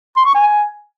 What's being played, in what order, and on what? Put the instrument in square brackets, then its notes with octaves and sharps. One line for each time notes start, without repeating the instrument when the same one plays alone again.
[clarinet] C6
C#6
G#5